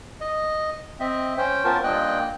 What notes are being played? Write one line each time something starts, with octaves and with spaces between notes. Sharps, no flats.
D#5
C4 D#5 E5
C#4 C5 G5
B3 C#4 F4 A#4 C5 A5
G2 A#2 A#3 D#5 G5 F#6